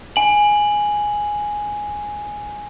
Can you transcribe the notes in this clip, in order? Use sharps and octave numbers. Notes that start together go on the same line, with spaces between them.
G#5 F#7